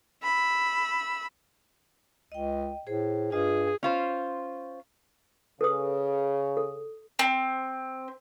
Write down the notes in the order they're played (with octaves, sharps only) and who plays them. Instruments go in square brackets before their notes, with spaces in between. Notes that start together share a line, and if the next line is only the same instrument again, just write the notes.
[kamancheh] B5 E6
[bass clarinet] C#2 [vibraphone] D#5 G5
[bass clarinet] A2 [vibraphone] G#4 C5
[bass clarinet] G2 [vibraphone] F4 D#5 [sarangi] G#4
[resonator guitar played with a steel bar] C#4 F4 C5
[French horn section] C#3 [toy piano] A4 B4 D#6
[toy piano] A4
[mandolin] C4